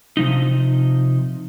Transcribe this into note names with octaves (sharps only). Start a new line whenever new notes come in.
C3 F3 D#4